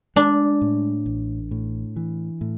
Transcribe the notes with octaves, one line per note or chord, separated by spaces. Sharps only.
G#3 D4
A2
A1
A2
E3
A2